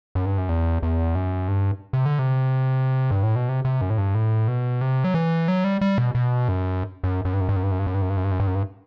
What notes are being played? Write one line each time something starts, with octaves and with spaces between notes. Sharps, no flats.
F#2
G2
F#2
E2
E2
F#2
G2
C3
D3
C3
G2
A2
B2
C3
C3
F#2
A2
G2
A2
B2
C3
F#3
E3
F#3
G3
G3
B2
B2
F#2
F#2
F#2
G2
F#2
G2
F#2
G2
F#2
G2
F#2
G2
F#2
G2
F#2
G2
F#2
G2
F#2
G2